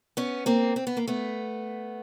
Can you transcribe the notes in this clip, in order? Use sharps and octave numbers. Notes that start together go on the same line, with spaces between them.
B3 C#4
A#3 C4
C4
B3
A#3
A3 B3